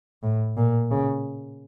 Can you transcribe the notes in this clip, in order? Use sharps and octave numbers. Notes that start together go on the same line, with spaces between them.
A2
A#2
C#3